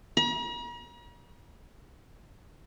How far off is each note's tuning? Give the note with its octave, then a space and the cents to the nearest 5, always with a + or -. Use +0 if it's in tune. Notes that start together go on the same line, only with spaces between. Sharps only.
A#5 +45